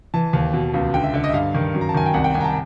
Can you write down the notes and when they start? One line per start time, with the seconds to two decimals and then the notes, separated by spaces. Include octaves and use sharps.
0.14 E3 A5
0.33 D#2
0.54 B2
0.74 C#2
0.94 D3 G5
1.03 E5
1.14 D3 E5
1.24 D#5
1.29 E5
1.33 G2 F5
1.54 D#3
1.74 F#2
1.81 A#5
1.89 A5
1.94 D#3 G#5
2.06 G5
2.14 C2 F#5
2.24 G5
2.34 C2 G#5
2.40 A#5
2.44 A5